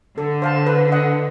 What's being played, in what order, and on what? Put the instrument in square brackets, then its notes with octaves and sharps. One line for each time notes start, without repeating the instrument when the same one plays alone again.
[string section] D3 [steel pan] A4
[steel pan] C5 F5 A5
B4
D#5 F#5